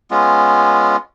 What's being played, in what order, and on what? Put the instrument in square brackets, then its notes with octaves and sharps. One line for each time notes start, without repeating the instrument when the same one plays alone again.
[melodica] G#3 B3 C#4 F4